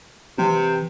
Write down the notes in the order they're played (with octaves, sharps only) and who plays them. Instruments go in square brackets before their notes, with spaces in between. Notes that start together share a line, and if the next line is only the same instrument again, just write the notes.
[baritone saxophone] C3 [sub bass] E3